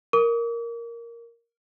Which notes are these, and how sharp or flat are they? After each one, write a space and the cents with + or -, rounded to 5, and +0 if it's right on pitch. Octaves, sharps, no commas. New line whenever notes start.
A#4 +0 D6 -40